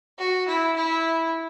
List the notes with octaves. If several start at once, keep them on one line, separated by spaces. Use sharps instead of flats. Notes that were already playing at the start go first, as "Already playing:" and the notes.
F#4
E4
E4